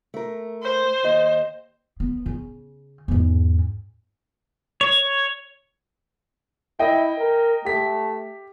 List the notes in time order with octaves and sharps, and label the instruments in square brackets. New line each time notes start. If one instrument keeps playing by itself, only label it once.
[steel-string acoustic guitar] A3 A#4
[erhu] C5
[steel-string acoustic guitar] D#2 D#5
[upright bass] B3
C#3
E2 G#2
[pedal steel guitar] C#5
[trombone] E4 [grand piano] D#5 G5
[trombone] A#4
[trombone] A3 [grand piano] G4 B6